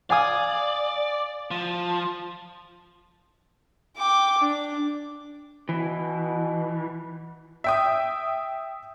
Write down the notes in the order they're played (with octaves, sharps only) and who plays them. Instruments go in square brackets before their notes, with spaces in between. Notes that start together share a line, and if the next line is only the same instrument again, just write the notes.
[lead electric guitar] D5 [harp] F5 G#5 D#6
[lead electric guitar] F3
[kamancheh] G5 D6
D4
[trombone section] B2 [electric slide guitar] E3
[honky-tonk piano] E5 G5 D#6